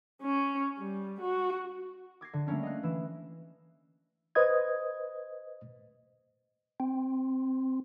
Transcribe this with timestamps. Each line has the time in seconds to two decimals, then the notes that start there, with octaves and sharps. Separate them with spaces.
0.22 C#4
0.78 G3
1.21 F#4
2.21 D6 G#6 A#6 C7
2.33 D3
2.47 G3 A3 A#3 C#4 D4
2.63 D#5 F5 F#6
2.83 E3 E7
4.35 B4 C5 D#5 D#6 G#6
6.80 C4